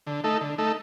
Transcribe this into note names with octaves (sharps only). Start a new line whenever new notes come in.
D3
A3 D#4 A4
D3
A3 D#4 A4